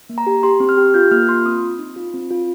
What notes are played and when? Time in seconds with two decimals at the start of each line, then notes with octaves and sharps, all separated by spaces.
0.09 A#3
0.18 A#5
0.27 G4
0.43 G4 C6
0.60 C4
0.69 F6
0.77 G4
0.94 F4 G6
1.11 A#3 F6
1.29 F4 C6
1.46 C4 D#6
1.62 C4
1.79 D#4
1.96 F4
2.14 C4
2.31 F4